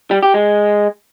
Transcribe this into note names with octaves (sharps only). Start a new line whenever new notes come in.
G3
G4
G#3